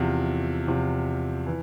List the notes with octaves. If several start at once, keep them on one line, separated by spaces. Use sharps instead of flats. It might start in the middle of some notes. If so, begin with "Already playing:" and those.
Already playing: E2 C3 F3
E2 C3 F3
E3